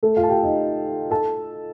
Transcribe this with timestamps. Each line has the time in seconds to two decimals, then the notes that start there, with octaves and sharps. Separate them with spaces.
0.03 A3 A4
0.17 F4 F5
0.23 A5
0.29 G4 G5
0.43 D#4 D#5
1.11 A4 A5